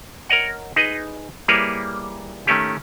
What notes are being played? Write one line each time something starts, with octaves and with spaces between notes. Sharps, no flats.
A#4 C#5 D#5 F#5
D#4 G#4 B4 D#5
G3 A#3 E4 G#4 B4 C#5
D#3 A3 C#4 G4